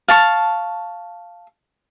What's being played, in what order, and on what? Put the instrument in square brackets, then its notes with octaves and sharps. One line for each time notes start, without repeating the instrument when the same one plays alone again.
[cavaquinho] F5 A5 C#6